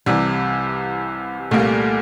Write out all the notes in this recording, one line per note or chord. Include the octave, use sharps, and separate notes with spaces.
C2 C3 E3 G3
C2 A#2 G3 A3 A#3